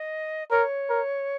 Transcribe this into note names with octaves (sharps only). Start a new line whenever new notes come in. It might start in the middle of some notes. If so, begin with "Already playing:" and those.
Already playing: D#5
A#4 C#5
A#4